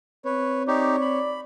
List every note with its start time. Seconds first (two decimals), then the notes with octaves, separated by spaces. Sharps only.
0.25 C4 B4 C#5
0.68 D#4 G4 C#5 D5
1.01 B5